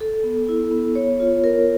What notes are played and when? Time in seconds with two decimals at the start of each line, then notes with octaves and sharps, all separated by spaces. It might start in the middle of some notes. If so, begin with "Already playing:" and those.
0.01 A4
0.24 B3
0.49 E4
0.71 B3
0.95 C#5
1.20 F4
1.44 A#4